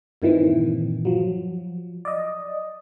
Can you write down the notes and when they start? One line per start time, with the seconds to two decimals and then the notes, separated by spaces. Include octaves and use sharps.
0.22 G2 A#2 D#3 E3 C4
1.05 F3 F#3
2.05 D5 D#5